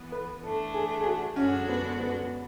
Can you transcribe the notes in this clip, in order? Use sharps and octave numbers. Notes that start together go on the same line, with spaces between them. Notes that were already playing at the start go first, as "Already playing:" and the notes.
Already playing: E3 B3
B4
E3 A3 D4 A4
G#4
G#4
F#4
F#2 D3 G#3 C#4 D4 F#4
B3
B3